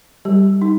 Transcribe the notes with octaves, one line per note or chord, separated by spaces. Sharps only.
G3 G4
D#4